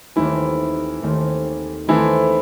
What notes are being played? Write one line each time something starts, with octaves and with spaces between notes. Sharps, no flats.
D#2 D#3 E3 A3 C4 E4
D#2 D#3 A3 C4
D#3 E3 A3 C4 D#4 E4 A4